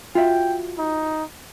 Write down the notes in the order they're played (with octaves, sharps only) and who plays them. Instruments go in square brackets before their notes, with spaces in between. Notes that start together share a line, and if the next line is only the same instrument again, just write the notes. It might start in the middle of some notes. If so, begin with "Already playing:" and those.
[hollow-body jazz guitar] F4 F#4 E5 [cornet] G5
[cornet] D#4